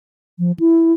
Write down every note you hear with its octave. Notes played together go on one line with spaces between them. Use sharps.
F3
E4